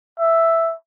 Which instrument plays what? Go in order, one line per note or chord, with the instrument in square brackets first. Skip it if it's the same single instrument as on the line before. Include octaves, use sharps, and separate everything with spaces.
[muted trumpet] E5